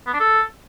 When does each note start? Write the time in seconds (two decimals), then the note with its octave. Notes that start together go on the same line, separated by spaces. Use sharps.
0.07 B3
0.13 D4
0.20 A4